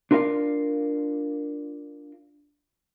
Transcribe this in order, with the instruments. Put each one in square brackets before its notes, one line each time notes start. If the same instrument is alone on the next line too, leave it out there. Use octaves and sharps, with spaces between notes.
[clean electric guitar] D4 F4 A#4 D5 F5